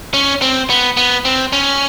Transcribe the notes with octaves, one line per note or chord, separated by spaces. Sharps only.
C#4
C4
B3
B3
C4
C#4